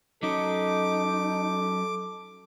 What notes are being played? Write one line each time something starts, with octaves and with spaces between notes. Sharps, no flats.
F#3 C#4 D#4 A4 D6